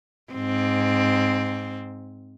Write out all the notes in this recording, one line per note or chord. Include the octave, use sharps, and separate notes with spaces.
G#2 C4